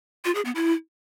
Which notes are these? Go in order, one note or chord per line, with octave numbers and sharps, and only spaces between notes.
F4
G#4
B3
E4